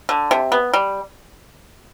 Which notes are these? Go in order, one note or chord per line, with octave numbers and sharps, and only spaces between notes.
D3
C3
B3
G3